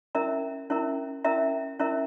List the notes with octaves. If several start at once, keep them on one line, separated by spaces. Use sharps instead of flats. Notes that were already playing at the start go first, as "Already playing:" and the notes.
C#4 E4 A#4 E5 A#5
C#4 E4 A#4 E5 A#5
C#4 E4 A#4 E5 A#5
C#4 E4 A#4 E5 A#5